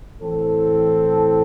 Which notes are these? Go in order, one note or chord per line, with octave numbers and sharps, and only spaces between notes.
A2 E3 C4 A4